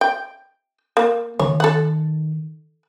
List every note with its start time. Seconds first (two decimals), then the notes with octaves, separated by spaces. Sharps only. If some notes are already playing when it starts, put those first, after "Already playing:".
0.01 G5
0.97 A#3
1.39 D#3 C#5
1.60 A4 F#5